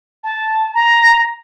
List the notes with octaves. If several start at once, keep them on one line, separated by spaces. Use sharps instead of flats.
A5
A#5